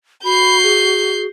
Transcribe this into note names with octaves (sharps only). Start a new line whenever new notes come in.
F#4 B5 G6 C7
G#4